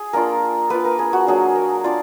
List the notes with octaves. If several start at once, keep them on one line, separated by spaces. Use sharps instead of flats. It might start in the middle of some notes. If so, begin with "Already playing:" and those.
Already playing: G#4
A#3 D4 F4 A#4
A#3 F4 B4
A#4
G#4
F#4
F#3 A#3 D4 G#4
A#4
D4 F4 D5